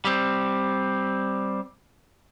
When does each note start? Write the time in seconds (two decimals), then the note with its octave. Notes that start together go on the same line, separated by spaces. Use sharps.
0.05 G3 C4